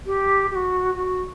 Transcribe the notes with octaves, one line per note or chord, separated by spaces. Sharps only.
G4
G4
F#4
F#4